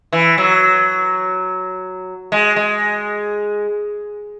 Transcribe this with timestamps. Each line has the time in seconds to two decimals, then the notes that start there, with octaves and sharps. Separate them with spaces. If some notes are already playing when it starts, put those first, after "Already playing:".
0.13 E3
0.38 F#3
2.32 G#3
2.56 G#3